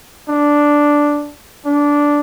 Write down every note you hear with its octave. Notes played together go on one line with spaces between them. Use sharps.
D4
D4